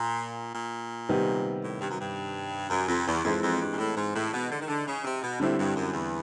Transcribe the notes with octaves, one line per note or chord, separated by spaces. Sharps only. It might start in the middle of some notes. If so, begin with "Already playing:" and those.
Already playing: A#2
A#2
C3 D#3 G3 B3
A2
G2
F#2
G2
F#2
F2
E2
F2 E3 G#3 C4 D#4
F2
G2
A#2
A2
G#2
A2
B2
D3
D#3
D3
C#3
C3
B2
A2 D3 G3 C4 E4
G2
F#2
E2